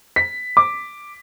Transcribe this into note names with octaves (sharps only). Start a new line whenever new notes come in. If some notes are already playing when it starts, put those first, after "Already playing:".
B6
D6